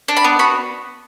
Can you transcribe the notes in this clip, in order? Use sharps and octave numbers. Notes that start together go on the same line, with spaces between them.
D4
B5
B3
F#4 B5